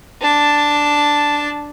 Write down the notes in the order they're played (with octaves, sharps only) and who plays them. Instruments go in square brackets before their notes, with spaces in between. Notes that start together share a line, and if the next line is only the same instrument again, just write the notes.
[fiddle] D4 A5